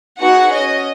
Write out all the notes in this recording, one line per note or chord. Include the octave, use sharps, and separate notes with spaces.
B3 D#4 F#4 G#4 F#5
C#4 F#4 D#5